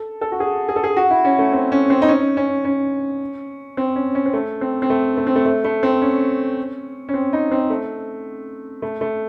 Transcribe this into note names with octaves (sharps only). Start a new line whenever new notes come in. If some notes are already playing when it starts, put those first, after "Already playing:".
Already playing: A4
A4
F#4
G#4
G#4
A4
G#4
F#4
E4
C#4
A3
C4
C#4
C4
D#4
C#4
C#4
C#4
C4
C#4
C#4
C4
A3
C4
C4
A3
A3
C4
A3
A3
A3
C4
C#4
C#4
C4
D#4
C4
A3
A3
A3